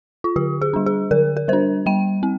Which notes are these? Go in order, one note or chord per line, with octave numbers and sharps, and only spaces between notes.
F4
D3 G4
G#4
G3 D4
G#4
D3 A#4
A#4
G3 D4 C5
G3 G5
C4